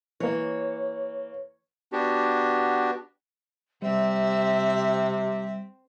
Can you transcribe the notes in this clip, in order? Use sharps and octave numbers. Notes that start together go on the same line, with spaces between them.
E3 A#3 C#5
B3 D4 F#4 G4
C3 G3 C4 E5